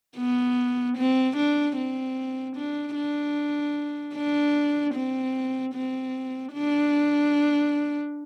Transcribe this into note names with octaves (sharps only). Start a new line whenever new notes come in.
B3
C4
D4
C4
D4
D4
D4
C4
C4
D4